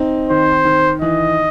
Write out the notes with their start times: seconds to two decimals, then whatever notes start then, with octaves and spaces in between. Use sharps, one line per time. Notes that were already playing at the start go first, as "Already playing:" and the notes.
Already playing: C4 D#4
0.30 D#3 C5
0.65 D#3
1.02 E3 D#5